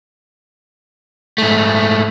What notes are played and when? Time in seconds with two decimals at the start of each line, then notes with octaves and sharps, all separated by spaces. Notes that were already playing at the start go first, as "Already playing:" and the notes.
1.38 G#2 A3